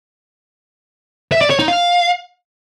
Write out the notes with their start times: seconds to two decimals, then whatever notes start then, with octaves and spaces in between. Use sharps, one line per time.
1.32 E5
1.41 D5
1.50 C#5
1.59 D#4
1.68 F5